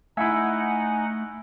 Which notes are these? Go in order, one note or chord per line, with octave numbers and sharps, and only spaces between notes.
A3 D#4 E4 E5 F#5 G#5